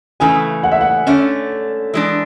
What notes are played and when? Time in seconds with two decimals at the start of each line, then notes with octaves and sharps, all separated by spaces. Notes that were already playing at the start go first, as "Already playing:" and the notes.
0.20 C#3 E3 A3 G#5
0.63 F#5
0.72 E5
0.81 F#5
1.07 D3 A3 C#4 E5
1.94 E3 G#3 D4